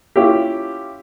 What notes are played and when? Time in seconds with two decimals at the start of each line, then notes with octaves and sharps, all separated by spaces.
0.16 C#4 E4 F4 G4